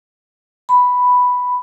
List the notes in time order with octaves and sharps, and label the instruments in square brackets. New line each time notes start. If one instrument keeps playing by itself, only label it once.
[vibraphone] B5